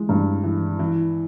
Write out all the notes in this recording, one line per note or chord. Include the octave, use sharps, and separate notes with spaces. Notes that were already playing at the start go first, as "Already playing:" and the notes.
Already playing: E3 G#3
G2
E3
E3